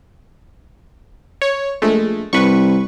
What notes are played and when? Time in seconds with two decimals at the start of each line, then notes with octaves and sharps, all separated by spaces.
1.42 C#5
1.82 A#1 G#3 A3
2.33 C2 B4 C#6